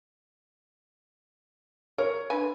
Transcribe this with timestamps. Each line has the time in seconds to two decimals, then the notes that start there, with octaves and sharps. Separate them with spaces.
1.98 A#4 C#5
2.30 D3 B4 G#5